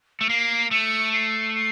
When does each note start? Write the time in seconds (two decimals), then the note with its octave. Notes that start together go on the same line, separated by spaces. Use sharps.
0.21 A3
0.29 A#3 C7
0.71 A3 C#7
1.14 C7
1.55 C7